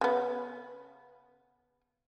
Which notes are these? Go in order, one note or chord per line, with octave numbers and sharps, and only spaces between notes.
C#3 B3